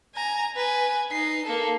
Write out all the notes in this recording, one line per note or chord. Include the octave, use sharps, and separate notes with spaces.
G#5 A#5
B4 G#5
D#4 C7
A#3 A4